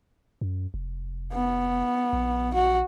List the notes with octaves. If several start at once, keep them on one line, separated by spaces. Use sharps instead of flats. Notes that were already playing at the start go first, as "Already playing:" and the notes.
F#2
F1
B3
A#1
F#4